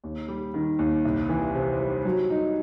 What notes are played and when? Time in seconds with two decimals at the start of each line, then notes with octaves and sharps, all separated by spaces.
0.04 D#2
0.28 G3
0.54 D#3
0.79 D#2
1.05 C2
1.29 E3
1.55 C3
1.81 G3
2.05 F#3
2.30 D#4